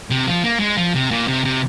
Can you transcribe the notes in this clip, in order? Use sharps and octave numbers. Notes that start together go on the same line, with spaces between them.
C3
F3
A#3
G#3
F3
C3
A#2
C3
C3